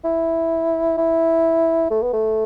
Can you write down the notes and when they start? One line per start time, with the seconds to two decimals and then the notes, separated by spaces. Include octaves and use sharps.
0.05 E4
0.98 E4
1.91 A3
2.03 B3
2.13 A3